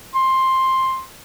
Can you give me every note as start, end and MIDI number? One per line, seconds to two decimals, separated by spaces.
0.15 1.02 84